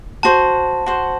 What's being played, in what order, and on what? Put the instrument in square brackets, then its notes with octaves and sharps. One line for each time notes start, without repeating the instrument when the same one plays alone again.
[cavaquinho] F#4 C5 F#5 [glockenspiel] A5
[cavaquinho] F#4 C5 F#5